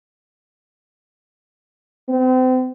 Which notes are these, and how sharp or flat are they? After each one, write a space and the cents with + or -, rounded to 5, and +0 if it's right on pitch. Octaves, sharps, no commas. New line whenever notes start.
C4 -35